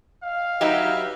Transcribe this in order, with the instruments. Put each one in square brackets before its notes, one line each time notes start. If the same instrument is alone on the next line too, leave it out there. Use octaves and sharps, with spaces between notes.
[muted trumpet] F5
[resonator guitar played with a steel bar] F#3 D#4 G4 [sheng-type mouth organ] B4 D#5 E5